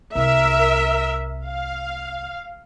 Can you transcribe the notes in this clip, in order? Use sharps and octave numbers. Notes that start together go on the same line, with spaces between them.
C2 A#4 E5
F5